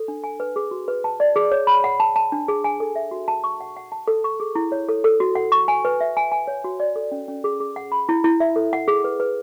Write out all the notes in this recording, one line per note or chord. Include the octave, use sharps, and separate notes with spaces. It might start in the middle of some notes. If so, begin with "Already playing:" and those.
Already playing: A4
D4
G#5
B4
G#4
F#4
B4
A5
D5
G#4
C#5
B5
F#5
A5
A5
D4
G#4
G#5
A4
E5
F#4
A5
C#6
F#5
F#5
A5
A4
C#6
G#4
E4
C#5
A4
A4
F#4
F#5
C#6
G#5
B4
E5
G#5
G#5
C#5
F#4
D5
A4
C#4
C#4
G#4
G#4
F#5
B5
E4
E4
E5
A4
F#5
G#4
B4
B4